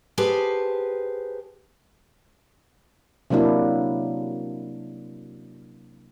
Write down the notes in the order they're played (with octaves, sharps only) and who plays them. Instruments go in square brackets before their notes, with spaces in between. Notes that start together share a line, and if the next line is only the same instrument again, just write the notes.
[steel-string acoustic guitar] G4 G#4 B4 C5 G#5 A5
[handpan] C3 F#3 A#3 D4 E4